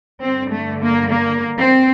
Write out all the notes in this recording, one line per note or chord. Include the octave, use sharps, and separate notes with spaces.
G2 D3 C4
A3
A#3
A#3
C4